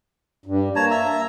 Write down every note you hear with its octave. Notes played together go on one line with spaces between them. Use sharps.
G2
A#3 C#5 A5 A#5
E5 A#5